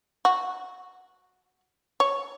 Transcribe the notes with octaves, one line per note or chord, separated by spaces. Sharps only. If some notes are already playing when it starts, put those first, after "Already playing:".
F#4
C#5